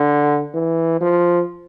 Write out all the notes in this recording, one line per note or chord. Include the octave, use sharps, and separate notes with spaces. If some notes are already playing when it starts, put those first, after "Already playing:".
Already playing: D3
E3
F3